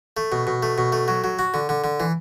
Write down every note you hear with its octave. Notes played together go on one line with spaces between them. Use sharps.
A3
B2
B2
A3
B2
A3
F#3
F#3
F#4
D3
D3
D3
E3